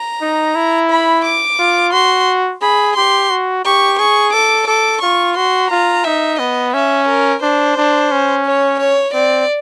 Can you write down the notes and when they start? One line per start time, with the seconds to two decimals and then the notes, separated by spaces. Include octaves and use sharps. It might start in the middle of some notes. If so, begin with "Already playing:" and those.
Already playing: A#5
0.22 D#4
0.55 E4
0.90 B5
1.25 D6
1.59 F4
1.93 F#4 C6
2.62 G#4 B5
2.97 G4 C6
3.30 F#4
3.65 G4 C#6
3.99 G#4 C#6
4.33 A4 D6
4.67 A4 D6
5.02 F4 C#6
5.36 F#4 C6
5.70 F4 A#5
6.05 D#4 E5
6.39 B3 D#5
6.74 C#4 E5
7.08 A#4
7.42 D4 C5
7.77 D4
8.11 C#4
8.46 C#5
8.80 C#5
9.14 C4 D5